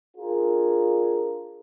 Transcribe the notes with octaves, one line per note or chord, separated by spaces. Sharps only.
D4 F4 G#4 A#4